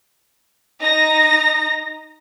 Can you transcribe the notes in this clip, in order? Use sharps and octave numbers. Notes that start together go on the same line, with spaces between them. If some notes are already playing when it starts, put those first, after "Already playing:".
D#4 A#5 A#6